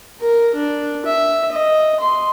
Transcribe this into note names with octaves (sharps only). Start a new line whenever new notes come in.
A#4
D4
E5
D#5
C6